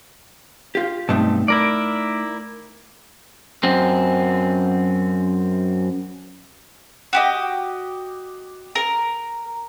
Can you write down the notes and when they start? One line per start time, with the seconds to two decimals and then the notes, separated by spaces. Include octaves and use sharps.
0.75 F4 G4
1.09 B1 G2 A3 C4 D#4 A5
1.48 E4 A#4 D5
3.63 F#2 C4
7.13 F#4 G4 D#5
8.75 A#4